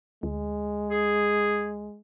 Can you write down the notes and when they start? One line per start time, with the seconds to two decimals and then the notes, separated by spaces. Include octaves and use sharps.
0.23 D2 G#3
0.90 G#4